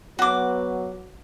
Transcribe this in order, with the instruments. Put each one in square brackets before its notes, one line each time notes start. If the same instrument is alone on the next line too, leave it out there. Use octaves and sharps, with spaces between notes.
[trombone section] F#3 B3 [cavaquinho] F#4 D6